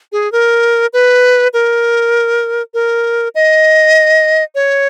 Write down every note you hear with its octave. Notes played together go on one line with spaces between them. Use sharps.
G#4
A#4
B4
A#4
A#4
D#5
C#5